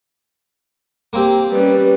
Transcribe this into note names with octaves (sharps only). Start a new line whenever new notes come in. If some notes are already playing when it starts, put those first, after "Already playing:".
A#3 C4 G4
G3 C#4 B4